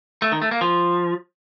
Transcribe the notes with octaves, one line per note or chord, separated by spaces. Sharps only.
A3
D#3
A3
A#3
F3